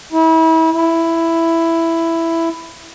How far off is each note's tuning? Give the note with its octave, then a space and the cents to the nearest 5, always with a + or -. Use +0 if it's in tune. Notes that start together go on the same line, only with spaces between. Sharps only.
E4 -35
E4 +5